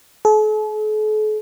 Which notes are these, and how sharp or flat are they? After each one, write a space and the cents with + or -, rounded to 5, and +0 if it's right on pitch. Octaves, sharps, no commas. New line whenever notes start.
A4 -45